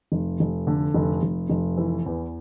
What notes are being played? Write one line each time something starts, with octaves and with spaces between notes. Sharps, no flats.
F1
F1
D3
F1
F1
F1
E3
E2